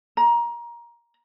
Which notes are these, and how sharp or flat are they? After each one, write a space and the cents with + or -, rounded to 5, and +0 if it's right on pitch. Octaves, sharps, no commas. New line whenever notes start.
A#5 +20